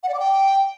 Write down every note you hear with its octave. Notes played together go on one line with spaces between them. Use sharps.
F#5
D5
D6
G5